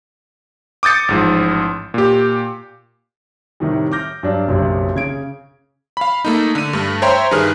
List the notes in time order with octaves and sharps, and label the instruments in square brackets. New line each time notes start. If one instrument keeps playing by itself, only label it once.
[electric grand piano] D6 D#6 G6 A6 C#7
A1 G#2 F3
A#2 G4
[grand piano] A2 C3 D#3 G3
D6 F6 G6 A#6
G2 F#3 D4
F#1 B1 F#2 C3
C#3 G#6 D7
[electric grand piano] F5 B5
A3 A#3 D#4
D3 D#7
G2 A3
C5 C#5 E5 G5 A#5 C6
G2 D#3 G#4 B4 F6